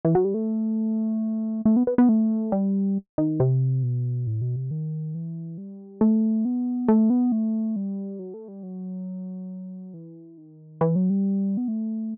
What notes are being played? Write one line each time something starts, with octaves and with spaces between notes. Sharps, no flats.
E3
F#3
G3
A3
A3
B3
B3
B3
A3
G3
D#3
C3
B2
A2
B2
C3
D#3
E3
G3
A3
B3
A3
B3
A3
G3
F#3
A3
G3
F#3
E3
D#3
E3
F#3
G3
B3
A3